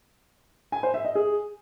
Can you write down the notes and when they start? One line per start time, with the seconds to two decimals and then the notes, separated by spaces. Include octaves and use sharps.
0.72 G#5
0.83 C5
0.94 E5
1.05 D#5
1.15 G#4